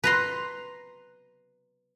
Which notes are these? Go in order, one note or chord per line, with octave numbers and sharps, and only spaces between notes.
B4 A#5 C6